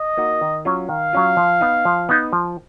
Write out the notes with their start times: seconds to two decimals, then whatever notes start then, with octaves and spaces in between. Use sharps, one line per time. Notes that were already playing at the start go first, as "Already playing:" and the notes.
Already playing: D#5
0.17 A#3 D#4 F#4
0.41 D#3
0.65 F#3 C#4 F4
0.89 D#3 F5
1.13 F#3 C#4 F4
1.37 F3
1.61 B3 D#4
1.85 F3
2.09 B3 D#4
2.33 F3